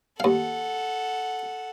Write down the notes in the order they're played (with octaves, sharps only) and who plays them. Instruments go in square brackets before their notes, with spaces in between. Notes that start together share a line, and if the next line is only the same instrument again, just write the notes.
[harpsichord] D#2 F5 [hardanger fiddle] A4 F#5